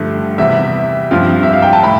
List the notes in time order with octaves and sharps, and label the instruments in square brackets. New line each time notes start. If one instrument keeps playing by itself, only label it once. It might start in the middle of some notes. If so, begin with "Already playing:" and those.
Already playing: [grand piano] G2 D3 F3 A3
[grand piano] E2 C3 G3 [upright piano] E5
[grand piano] G2 F3 C4 F4
[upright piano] E5
F5
G5
A5
[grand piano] A2 [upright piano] B5